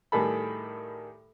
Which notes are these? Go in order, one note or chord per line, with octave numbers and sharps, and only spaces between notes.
A2 D#3 G3 G#4 A4 B5